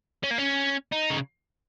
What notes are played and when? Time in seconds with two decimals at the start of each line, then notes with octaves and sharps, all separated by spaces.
0.24 C#4
0.31 A#3
0.38 C#4
0.92 D#4
1.10 C#3